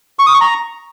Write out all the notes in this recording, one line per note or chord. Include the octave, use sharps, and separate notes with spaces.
C#6
D#6
C#6
A#5